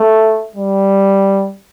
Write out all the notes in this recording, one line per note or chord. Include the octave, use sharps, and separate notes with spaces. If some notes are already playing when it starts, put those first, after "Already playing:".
Already playing: A3
G3